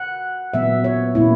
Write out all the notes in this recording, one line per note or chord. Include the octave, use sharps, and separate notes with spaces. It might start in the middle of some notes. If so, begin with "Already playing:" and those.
Already playing: F#5
A#2 F#3 B3 E5
C#5
A#2 A#3 C#4 E4